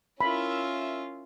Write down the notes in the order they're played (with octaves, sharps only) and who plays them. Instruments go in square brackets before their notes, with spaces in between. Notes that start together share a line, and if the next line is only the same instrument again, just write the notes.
[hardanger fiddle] C#4 F4 [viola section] E4 A#4 E5 [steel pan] B5